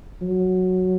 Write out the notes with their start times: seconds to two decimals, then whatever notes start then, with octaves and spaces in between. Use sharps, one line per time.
0.22 F#3